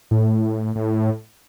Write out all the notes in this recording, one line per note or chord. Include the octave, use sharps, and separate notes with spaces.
A2
A2